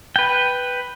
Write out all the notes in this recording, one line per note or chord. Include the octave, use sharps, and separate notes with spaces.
B4 G5